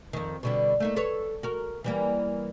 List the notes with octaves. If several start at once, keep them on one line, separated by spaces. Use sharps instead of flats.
F2 D#3
B2 D3 G3
A3 A#3 D#4
A4 B4 C#5
F#4 A#4
E3 G3 A#3